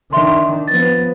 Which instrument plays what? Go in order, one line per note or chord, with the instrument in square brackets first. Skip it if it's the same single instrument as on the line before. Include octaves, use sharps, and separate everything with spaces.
[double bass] D#3 D4 [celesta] E5 C6
[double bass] F3 B3 [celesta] A6